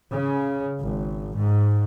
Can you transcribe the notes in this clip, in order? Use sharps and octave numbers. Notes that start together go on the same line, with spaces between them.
C#3
G#1
G#2